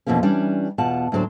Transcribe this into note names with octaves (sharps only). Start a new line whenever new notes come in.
F2 B2 E3 F3 A#3 C#4
E3 G3 C#4 D4
E2 B2 F4 F#5 A5
D2 A2 F#3 D4 C5